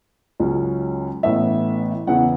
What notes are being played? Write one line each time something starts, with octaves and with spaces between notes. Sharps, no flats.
C#2 C#3 F#3 C#4
A1 A2 E3 B3 E5
E2 C#3 E3 B3 E4 F#5